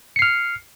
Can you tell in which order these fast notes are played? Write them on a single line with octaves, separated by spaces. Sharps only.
C#7 C7 F6